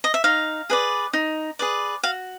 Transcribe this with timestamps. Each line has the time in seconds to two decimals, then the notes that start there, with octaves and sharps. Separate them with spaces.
0.04 D#5
0.14 E5
0.24 D#4 F5
0.70 G#4 B4 D5
1.13 D#4
1.59 G#4 B4 D5
2.03 F#4 F5